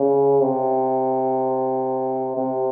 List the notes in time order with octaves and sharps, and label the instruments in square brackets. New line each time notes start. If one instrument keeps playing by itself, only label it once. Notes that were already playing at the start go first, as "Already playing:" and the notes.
Already playing: [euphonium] C#3
C3
C3